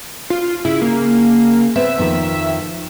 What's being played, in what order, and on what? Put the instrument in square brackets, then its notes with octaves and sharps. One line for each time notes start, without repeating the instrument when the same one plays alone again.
[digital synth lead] F4
[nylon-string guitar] C#3 [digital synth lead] E4
[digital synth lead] A#3
[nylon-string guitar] B3 C4 [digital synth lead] E5
[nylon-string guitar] F2 D#3 F3